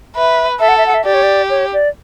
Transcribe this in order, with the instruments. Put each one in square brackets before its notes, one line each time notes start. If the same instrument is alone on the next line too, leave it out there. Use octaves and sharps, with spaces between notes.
[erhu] B4 [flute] E5
[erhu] A4 [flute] E5
[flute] F#5
E5
F#5
E5
[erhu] G4 [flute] D5
[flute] C#5
D5
C#5
D5